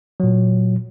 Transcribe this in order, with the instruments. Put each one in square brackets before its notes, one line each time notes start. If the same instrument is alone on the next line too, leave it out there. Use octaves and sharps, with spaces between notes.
[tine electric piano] A#2 F#3